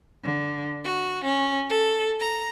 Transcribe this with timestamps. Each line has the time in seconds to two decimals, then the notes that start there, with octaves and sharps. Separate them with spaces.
0.23 D3
0.83 F#4
1.24 C#4
1.70 A4
2.19 A#5